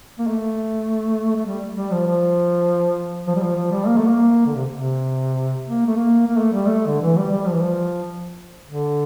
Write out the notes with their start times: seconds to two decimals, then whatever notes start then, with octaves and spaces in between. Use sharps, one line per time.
0.19 A#3
0.27 A3
1.36 A3
1.47 G3
1.77 G3
1.91 F3
2.07 F3
3.27 F3
3.36 G3
3.41 F3
3.56 F3
3.71 G3
3.87 A#3
3.97 A3
4.08 A#3
4.46 D3
4.56 C3
4.72 C3
5.67 A#3
5.87 A3
5.96 A#3
6.26 A#3
6.39 A3
6.53 G3
6.67 A3
6.87 D3
7.02 E3
7.17 G3
7.32 G3
7.46 F3
7.54 E3
7.62 F3
8.67 D3